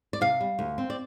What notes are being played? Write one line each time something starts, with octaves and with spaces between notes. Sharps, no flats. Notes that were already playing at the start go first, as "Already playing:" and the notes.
D5
C3 F5
G3
D2
C4
D5